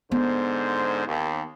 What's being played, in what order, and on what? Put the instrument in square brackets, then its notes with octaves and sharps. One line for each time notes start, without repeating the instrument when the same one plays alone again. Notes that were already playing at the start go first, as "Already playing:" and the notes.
[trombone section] G#2 D3 C5 [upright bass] B3
[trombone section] D#2